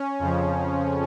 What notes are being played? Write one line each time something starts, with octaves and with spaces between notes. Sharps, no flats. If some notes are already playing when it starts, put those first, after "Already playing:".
Already playing: C#4
F2 C#3 F3